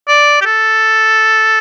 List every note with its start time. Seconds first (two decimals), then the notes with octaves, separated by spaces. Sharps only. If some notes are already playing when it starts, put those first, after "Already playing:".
0.08 D5
0.41 G4
0.46 A4